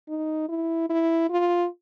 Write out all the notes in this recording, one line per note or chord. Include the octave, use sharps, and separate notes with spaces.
D#4
E4
E4
F4